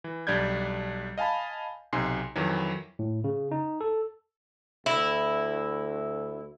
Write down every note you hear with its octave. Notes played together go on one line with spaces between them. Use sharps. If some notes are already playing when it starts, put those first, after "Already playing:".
E3
B1 G3 D4 D5 G6 G#6
D#5 F5 G#5 A5 B5
B1 C3 D#4 G#5 C6 C7
F2 D#3 E3 F#3
A2
C#3
D#4
A4
D2 E4 E5